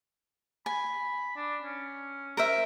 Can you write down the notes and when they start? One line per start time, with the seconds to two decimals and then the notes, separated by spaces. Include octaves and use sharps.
0.66 G#5 B5
1.36 D4
1.62 C#4
2.37 A#4 C5 E5